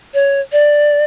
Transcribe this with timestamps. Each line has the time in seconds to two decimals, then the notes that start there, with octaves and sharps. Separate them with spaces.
0.14 C#5
0.52 D5